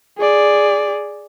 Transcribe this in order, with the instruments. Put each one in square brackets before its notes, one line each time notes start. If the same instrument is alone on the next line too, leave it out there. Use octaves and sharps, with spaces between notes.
[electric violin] G#4 D5